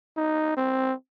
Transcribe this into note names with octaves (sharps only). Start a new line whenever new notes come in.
D#4
C4